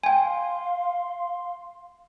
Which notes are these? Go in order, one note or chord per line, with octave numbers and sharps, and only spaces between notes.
F5 G5 G#5 C6